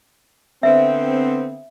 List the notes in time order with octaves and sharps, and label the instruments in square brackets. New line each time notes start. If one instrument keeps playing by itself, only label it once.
[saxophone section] D3 B3 C4 [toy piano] E5